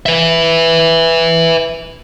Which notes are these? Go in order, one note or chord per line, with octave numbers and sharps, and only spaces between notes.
B4 E5